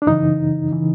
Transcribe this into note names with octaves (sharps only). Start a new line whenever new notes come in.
D4
F#2 C#3 E3 D#4
C#3 E3